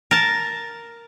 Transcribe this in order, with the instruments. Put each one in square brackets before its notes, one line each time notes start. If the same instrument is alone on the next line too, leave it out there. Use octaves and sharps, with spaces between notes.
[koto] A#4 A5